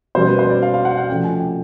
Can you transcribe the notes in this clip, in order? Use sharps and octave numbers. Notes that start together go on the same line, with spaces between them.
B2 G3 A#3 C#4 C5
B4
C5
D5
F5
F5
F#5
F#5
C3 F3 A3 C#4 G5
G#5
G5